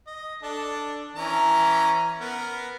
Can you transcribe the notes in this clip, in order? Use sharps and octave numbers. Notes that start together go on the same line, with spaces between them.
D#5
D4 A4
E3 C#4 A#5
B3 A#4